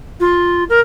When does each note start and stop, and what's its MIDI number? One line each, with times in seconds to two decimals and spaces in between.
0.20 0.64 65
0.69 0.80 70